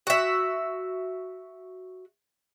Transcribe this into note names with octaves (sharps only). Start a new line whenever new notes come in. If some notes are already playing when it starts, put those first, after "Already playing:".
F#4 E5